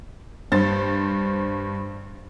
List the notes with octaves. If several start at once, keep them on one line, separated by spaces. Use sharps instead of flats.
G2 C5 A6